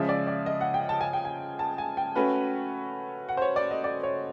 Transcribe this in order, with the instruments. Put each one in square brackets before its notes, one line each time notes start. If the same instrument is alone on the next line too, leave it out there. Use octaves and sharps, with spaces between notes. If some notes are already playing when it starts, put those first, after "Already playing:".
Already playing: [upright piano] C#3 F3 G#3 [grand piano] E5
[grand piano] D5
D5
D#5
F#5
G5
A5
G#5
G5
G#5
A5
G#5
G5
[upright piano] A3 C#4 F#4 B4
[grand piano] F#5
C5
C#5
D5
D#5
D5
C#5